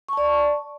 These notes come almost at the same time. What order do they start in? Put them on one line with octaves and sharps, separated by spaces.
C#6 A5 D5